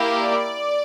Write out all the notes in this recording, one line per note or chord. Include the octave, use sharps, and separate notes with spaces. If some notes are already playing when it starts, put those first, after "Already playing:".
Already playing: A#3 E4 G4
D5